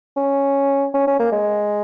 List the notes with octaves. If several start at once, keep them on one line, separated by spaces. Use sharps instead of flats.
C#4
C#4
C#4
A#3
G#3